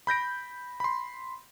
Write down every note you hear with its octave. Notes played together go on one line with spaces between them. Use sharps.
B5 G6 A#6 D7
B5 C6